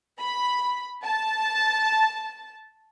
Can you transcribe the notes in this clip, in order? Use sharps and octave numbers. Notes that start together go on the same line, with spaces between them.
B5
A5